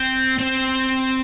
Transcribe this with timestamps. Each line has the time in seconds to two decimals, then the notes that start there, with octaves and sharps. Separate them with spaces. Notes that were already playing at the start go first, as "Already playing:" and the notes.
Already playing: C4
0.38 C4